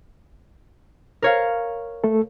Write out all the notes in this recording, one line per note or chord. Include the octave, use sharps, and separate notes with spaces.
A#4 C#5 F5
A3 A4